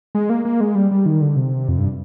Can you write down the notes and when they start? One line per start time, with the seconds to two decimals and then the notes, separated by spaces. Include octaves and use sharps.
0.15 G#3
0.30 A#3
0.45 A#3
0.61 G#3
0.75 G3
0.91 G3
1.06 D#3
1.21 D3
1.36 C3
1.69 F2
1.78 G2